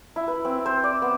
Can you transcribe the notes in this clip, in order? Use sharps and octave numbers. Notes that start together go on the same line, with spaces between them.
E4
B4
C4
C5
D5
B3